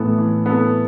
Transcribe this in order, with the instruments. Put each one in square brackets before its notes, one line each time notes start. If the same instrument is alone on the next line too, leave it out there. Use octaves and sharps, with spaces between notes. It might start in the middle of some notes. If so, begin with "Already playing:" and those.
Already playing: [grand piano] A2 [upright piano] E3 B3 A4
[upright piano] E3
B3 A4